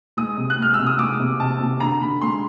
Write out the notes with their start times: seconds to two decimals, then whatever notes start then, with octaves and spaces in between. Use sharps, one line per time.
0.17 G#3 D#6
0.37 C3
0.50 F#6
0.59 G#3 F6
0.74 E6
0.79 C3
0.87 D#6
0.98 G#3 D6
1.20 C3
1.40 C3 A5
1.60 C3
1.80 D3 A#5
2.01 D3 B5
2.21 G#3 C6